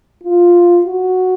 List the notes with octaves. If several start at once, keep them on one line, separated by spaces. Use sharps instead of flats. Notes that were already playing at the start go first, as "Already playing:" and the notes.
F4
F#4